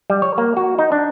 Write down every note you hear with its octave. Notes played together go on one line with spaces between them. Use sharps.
G3
C#5
A#3
F#4
D#4
D4